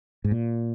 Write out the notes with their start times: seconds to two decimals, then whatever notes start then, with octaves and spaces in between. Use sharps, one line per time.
0.24 G#2
0.31 A#2